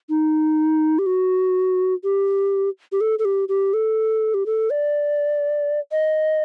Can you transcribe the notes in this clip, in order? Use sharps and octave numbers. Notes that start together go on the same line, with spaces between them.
D#4
G4
F#4
G4
G4
A4
A4
G4
G4
A4
G4
A4
D5
D#5